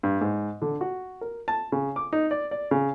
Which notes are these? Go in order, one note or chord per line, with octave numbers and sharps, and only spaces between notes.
G2
G#2
D3
F#4
A#4
A5
C#3
D6
D#4
D5
D5
C#3